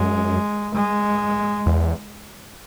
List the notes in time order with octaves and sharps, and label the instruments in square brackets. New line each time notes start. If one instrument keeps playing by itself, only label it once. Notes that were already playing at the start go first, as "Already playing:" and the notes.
Already playing: [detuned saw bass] F#2 [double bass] G#3
[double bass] G#3
[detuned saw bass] E2